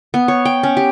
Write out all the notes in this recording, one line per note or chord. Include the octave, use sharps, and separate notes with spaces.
B3
C#5
G5
C#4
G4